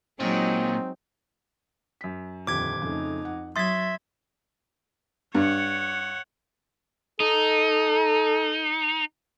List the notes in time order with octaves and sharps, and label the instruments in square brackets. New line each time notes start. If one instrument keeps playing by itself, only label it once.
[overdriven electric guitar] A#2 [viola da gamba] F#3 G#3 D#4 [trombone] C4
[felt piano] F#2 B6
[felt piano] D#1 G4 [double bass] F2 D3 [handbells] D6 G#6
[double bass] F2 D#4 [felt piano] C#3 A3
[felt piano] F#5
[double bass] F#3 [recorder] E5 [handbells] C6 G#6 [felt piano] D#6 A6 B6
[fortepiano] G2 [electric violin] C#5 F#5
[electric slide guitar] D#4 [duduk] A4